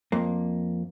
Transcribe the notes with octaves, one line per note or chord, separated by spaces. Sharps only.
F2 A#3